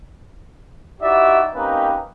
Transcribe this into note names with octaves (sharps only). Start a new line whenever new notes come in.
D#4 E4 F#4 G4 D5 E5
A#3 C4 C#4 D#4 G4 B4